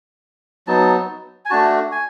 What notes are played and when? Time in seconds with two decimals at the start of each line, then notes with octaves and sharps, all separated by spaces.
0.67 F#3 B3 D#4 A5
1.45 G#5
1.50 A3 D4 F#4 A5
1.92 G#5